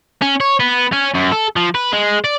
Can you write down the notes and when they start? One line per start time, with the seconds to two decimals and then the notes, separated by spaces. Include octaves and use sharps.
0.22 C#4
0.40 C#5
0.60 B3
0.92 C#4
1.14 F#2
1.32 A4
1.56 F3
1.75 B4
1.93 G#3
2.24 D5